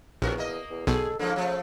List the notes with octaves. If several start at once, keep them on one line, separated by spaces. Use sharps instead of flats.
A#1 E2 B2 F#4 A#4
A#3 D#5
E2
B1 B2 G#4 A4
G#2 D3 F3 A#3
C#3 F3 A3